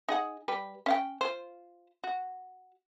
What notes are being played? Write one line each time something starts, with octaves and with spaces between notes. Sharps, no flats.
D#4 G#4 F#5
G3 B4 G5
C#4 F5 G5
F4 C5
F#4